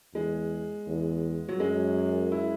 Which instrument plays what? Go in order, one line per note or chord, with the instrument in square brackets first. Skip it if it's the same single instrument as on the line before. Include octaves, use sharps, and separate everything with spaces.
[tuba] E2 [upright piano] G#3
[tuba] E2
[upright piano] F#3
[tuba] F#2 [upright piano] G#3
[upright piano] E4